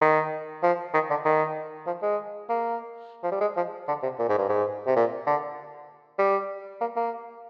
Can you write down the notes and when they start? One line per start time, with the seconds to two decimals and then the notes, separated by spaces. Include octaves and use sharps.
0.01 D#3
0.63 F3
0.94 D#3
1.10 D3
1.25 D#3
1.86 F3
2.02 G#3
2.49 A#3
3.23 F3
3.32 G3
3.41 G#3
3.56 F3
3.88 D3
4.03 C3
4.19 A#2
4.29 G#2
4.38 G2
4.49 G#2
4.87 C3
4.96 A#2
5.26 D3
6.18 G3
6.81 A#3
6.96 A#3